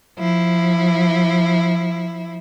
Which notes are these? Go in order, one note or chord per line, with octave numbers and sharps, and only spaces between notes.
F3 E4